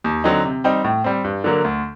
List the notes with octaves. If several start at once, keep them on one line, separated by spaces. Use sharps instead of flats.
D#2
D3 F#3 C4 D#4
C3
G3 C4 D#4
A2
G3 C4
G2
D3 F#3 A#3
D2